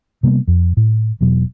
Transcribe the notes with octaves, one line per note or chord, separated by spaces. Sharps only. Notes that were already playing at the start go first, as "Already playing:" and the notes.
C3 G3 A#3 B3
F2
A2
E1 B2 F#3